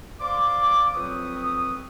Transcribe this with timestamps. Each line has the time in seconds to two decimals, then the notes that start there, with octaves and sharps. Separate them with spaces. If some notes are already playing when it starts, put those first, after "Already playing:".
0.20 C5 D5 F5 C6 D6
0.94 F2 F#3 C4 B4 C#5 D#6